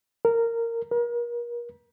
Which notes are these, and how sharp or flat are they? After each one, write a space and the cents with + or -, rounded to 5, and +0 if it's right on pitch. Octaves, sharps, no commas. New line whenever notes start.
A#4 -15
A#4 +35